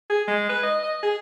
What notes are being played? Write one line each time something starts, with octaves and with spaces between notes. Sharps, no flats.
G#4
G#3
B4
D#5
D#5
G#4